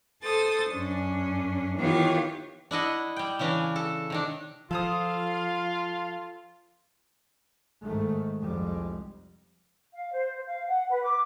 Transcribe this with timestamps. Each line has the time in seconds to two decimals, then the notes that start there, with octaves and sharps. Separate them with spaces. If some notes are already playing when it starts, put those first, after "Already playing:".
0.24 A4 C5 D#6 A6
0.71 F#2 C#4 D4
1.76 D#3 E3 B3 F4 G4 C#5
2.71 D4 E4 D#5 F#5
3.16 G3 G5
3.39 C#3 E3 C#4 D4
3.76 A4
4.10 C3 D#3 D4
4.71 F3 F4 A4 C5 F5 D#6
7.83 G#2 D#3 A3
8.41 F1 C2 F2 G3 G#3
9.94 F5
10.12 C5
10.47 F5
10.68 F#5
10.89 B4
11.04 D6